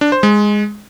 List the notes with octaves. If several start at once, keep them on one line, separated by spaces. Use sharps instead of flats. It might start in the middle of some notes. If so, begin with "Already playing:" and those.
D4
C5
G#3